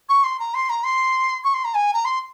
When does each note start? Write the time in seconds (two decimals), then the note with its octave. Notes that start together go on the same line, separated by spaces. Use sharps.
0.09 C#6
0.24 C6
0.39 A#5
0.54 C6
0.70 A#5
0.84 C6
1.44 C#6
1.54 C6
1.65 A#5
1.74 G#5
1.94 A#5
2.05 C6